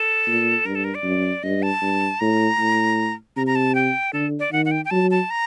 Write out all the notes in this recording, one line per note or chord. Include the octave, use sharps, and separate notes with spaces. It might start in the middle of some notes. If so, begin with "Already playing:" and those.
Already playing: A4
A#2
G2 A#4
A4
A#4
D5
F#2
G2 D#5
A5
G2
A2 A#5
A2
C3 A#5
A#5
A5
G5
D3 A4
D5
D#3 F#5
F#5
G5
G5
F#3 A5
A5
A#5